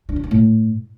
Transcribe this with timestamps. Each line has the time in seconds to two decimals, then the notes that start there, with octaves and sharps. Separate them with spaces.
0.09 D4
0.16 C#3
0.24 C#4
0.31 A2